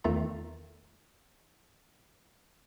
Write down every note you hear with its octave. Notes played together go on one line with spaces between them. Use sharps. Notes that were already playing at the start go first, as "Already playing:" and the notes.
E2 D#3 A3 F4 A#5